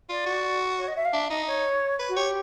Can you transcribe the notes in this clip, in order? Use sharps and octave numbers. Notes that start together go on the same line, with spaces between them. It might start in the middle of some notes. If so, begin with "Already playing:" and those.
F4 D5
F#4
C#5
D#5
E5
F5
D4 E5
D#4 D#5
C#5
B4
F#4
G4 C#5